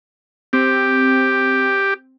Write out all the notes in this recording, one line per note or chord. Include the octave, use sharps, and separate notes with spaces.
C4 G4